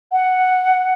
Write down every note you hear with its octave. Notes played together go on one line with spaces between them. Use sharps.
F#5